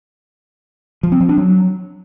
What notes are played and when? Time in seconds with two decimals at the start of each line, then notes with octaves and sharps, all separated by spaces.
1.03 F3
1.12 C4
1.20 F3
1.29 D4
1.37 F#3